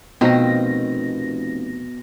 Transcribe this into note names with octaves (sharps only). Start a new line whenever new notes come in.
F1 B2 D#3 F3 B3 C4 A#6